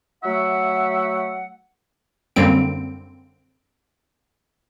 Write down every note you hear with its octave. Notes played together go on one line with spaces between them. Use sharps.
F#3 A3 E5 F#5
F#2 D3 G3 A#3 C4 D7